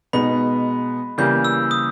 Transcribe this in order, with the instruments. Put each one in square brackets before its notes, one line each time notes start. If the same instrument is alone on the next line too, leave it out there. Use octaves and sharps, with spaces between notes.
[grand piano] B2 G#3 B3 D#4 [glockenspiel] B5
[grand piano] C#3 E3 G3 A#3 [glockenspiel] G6
[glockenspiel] E6
D#6